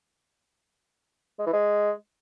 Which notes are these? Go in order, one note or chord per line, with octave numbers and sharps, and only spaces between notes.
G#3
E3
G#3